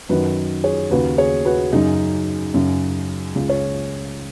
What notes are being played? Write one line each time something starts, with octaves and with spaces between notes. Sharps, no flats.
F#2 D#3 F#4 B4
G#4 C#5
D#2 C#3 F#4 B4
G#4 C#5
F#4 B4
F#2 C#3 D#4 G#4
F#2 C#3
C#2 C#3
C#5